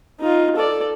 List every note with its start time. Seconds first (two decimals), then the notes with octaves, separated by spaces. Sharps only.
0.20 D#4 F4
0.56 A4 D5